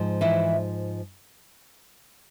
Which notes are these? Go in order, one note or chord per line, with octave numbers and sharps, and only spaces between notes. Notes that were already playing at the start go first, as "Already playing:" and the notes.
Already playing: G#2 F3
E3 E4